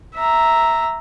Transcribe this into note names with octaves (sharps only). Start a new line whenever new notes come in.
E5 A#5